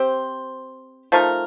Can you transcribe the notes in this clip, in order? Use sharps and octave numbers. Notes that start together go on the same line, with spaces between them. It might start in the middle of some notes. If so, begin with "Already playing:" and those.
Already playing: C4 G4 C5
F3 A3 D#4 A#4